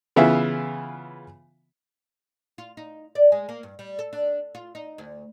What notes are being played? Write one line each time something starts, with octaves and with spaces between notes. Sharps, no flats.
C#3 E3 B3 F4 E5
F4
D#4
D5
G#3
A#3
G2
G3
A4
D4
F4
D#4
D2